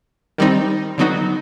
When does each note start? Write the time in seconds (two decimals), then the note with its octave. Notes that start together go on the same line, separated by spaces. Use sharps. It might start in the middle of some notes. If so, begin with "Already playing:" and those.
0.38 D#3 G3 C4 D#4
0.98 D3 F#3 B3 D#4 F#4